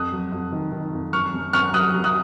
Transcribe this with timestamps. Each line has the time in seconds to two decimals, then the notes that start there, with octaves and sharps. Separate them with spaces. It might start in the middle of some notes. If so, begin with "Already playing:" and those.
Already playing: F2 D#6 F#6
0.12 F#3
0.32 F2
0.52 D#3
0.72 D#3
0.93 F2
1.13 F#2 C#6 F6
1.34 F#2
1.53 F#2 C#6 F6
1.73 F#3 D#6 F#6
1.94 F#3
2.04 D#6 F#6